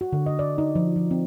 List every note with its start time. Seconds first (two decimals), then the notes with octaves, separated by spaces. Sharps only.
0.01 F#4
0.13 D3
0.26 D#5
0.39 D5
0.58 D#4
0.75 F3
0.96 F3
1.11 C4